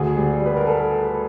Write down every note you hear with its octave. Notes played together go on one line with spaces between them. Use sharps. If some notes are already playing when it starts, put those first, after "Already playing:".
Already playing: D2 G#4
G3
G3
B4
A#4
A4